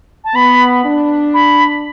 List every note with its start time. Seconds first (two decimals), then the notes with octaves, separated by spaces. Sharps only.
0.24 A5
0.35 B3 B5
0.85 D4
1.34 B5